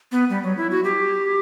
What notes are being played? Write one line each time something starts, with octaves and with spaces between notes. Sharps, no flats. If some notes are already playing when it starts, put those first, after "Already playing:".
B3
G3
F#3
E4
F#4
G4